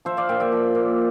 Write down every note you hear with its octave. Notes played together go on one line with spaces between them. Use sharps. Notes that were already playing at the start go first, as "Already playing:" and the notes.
F3 C5 E5
D5 F5
A#2 E5 G5
E5 G5
F3
A#2